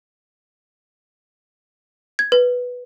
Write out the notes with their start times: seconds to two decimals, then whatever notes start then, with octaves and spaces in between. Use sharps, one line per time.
2.19 G#6
2.32 B4